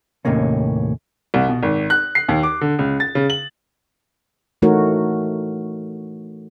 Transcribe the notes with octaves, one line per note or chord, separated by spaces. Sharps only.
D#2 A2 C3 A#3 C#4
C2
B2
G#1
F#6
C7
D#2
D6
D3
C#2
A6
C#3
F#7
E3 A3 D#4 F#4 A#4 C#5